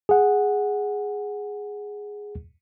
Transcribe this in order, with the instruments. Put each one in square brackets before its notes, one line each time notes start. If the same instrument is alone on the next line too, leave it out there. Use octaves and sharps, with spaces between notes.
[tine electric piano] G#4 F#5